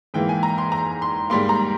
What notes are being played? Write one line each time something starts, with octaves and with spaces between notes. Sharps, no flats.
G#2 E3 A#3 G5
G#5
A#5
C6
A#5
C6
G#2 G3 A#3 C6
A#5